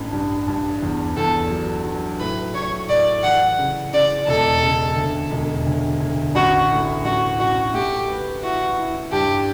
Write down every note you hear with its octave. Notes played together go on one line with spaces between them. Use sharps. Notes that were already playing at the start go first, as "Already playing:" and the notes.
Already playing: A1 G2
G2
G2
E2
E2 A4
F#3
F#3
A2 B4
A2 C#5
A2 D5
E3 F#5
C#3
C#3 D5
E1 A4
C#3
D2
E1
D2
D2
A1 F#4
A2
A1 F#4
A1 F#4
A3 G4
B4
E4 F#4
E4
G2 G4